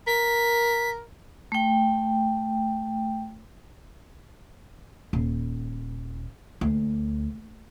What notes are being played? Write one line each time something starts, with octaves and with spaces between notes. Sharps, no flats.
A#4 B6
A3 G5
D#1
D2